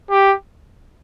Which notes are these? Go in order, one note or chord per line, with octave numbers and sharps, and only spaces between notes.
G4